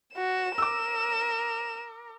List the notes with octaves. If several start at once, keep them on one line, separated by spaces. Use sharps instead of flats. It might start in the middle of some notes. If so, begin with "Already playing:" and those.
F#4 E7
A#4 D6 E6